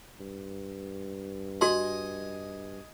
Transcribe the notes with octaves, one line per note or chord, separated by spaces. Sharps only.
G2
F#4 D#5 G#5 C6